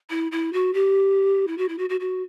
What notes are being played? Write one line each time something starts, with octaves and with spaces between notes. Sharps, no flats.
E4
E4
F#4
G4
E4
F#4
E4
F#4
F#4
F#4